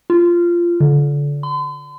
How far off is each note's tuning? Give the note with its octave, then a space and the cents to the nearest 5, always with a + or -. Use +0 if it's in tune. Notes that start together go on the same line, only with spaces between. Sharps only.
F4 -15
D3 -30
C6 -45